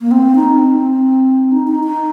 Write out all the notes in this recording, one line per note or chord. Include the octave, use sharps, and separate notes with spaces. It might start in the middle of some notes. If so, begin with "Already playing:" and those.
A#3
C4
D#4
C4
D#4
D#4
D#4